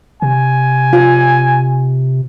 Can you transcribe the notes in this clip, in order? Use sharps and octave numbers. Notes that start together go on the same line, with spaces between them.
C3 G#5
F4